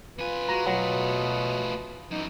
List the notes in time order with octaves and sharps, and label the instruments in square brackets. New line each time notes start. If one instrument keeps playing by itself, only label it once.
[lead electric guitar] F2 G#5 [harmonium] F4 B4
[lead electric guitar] G#3 [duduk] F#4 [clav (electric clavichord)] A#5
[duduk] B2 [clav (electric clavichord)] F#3 [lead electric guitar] A3 G#4
[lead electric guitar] F#2 E3 [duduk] D#4